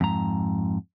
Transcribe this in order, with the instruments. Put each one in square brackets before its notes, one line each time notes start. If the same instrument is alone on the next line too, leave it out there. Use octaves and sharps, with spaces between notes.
[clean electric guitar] F2 G#2 A#5